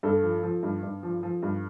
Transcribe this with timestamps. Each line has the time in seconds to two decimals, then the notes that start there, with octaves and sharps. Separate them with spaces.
0.03 G2 A4
0.23 F3
0.43 F3
0.63 G2
0.83 G2
1.03 F3
1.23 F3
1.43 G2